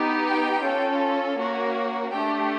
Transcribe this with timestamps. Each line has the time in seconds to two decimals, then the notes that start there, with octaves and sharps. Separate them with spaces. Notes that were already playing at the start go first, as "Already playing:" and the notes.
Already playing: B3 D#4 G4
0.26 G5
0.63 C#4 F4 A4
1.38 A#3 C#4 F#4
2.12 A3 D4 G4 G5